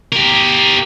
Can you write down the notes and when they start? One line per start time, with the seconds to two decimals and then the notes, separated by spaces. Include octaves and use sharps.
0.12 G4 A#4